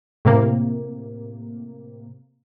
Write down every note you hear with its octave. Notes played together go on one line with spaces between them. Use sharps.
A2 C3 A#3